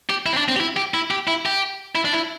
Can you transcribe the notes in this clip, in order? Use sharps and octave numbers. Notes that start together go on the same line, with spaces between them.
G4
E4
C4
D4
C4
G4
E4
G4
E4
G4
E4
G4
E4
D4
E4